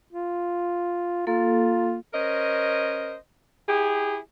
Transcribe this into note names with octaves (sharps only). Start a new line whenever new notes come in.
F4
A#3 F4 A4
C#4 A#4 C5 D#5
E4 G4 G#4